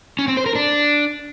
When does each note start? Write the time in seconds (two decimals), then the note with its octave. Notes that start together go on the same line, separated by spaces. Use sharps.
0.19 C#4
0.28 C4
0.37 C5
0.46 A#4
0.55 D4